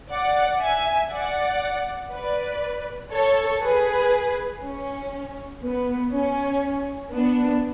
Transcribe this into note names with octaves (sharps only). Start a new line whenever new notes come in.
D5 F#5
E5 G#5
D5 F#5
B4 D5
A4 C#5
G#4 B4
C#4
B3
C#4
B3 D4